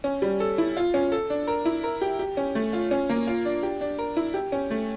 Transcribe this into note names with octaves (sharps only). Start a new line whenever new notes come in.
C#4
G3
A4
E4
F4
C#4
A4
D4
A#4
E4
A#4
G4
G4
C#4
A3
F4
C#4
A#3
F4
D4
G4
D4
A#4
E4
G4
C#4
A3